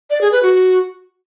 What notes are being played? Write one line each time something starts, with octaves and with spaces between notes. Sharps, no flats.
D5
G#4
B4
F#4